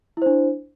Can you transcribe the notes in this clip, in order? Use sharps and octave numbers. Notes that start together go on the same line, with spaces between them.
D4 E4 C5